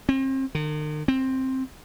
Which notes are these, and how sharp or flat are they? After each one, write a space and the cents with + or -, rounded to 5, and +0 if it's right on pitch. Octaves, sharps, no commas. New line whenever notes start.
C4 +35
D#3 -45
C4 +10